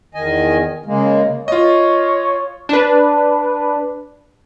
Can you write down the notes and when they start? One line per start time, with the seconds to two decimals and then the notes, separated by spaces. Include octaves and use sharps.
0.15 E2 D#3 D#5 G#5
0.86 C#3 G#3 A#3
1.48 F4 C#5 D#5
2.69 D4 B4